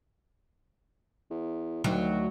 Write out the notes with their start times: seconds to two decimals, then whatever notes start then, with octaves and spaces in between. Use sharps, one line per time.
1.31 E2
1.84 D2 D#3 F#3